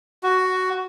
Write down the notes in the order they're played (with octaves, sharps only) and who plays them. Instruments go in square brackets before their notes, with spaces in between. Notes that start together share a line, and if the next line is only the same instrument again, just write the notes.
[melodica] F#4